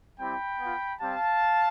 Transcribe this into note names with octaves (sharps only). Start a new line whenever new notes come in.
G3 C4 E4 G4 G5 B5
B3 F4
G3 C4 G4 F5 A5